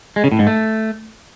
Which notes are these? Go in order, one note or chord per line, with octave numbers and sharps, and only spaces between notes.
G#3
C#3
A2
G#2
A3